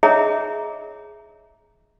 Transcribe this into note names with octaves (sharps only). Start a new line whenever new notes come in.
G#4 C#5 D#5 E5 A#5